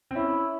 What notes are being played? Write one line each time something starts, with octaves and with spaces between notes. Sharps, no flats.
C4
C#4 E4